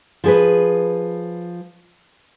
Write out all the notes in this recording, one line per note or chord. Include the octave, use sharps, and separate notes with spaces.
F3 G#4 B4